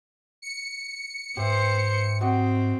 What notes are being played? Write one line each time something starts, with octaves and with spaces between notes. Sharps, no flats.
C#7
G#2 B3 G4 C5 E5
C4 F#4 G4 D#5